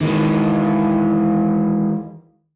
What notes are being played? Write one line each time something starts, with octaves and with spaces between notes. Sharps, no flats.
D#3 E3 G#3